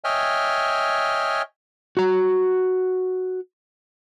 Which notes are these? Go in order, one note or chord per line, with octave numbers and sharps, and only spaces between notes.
C#5 D#5 E5 G5 G#5 F6
F#4 A#5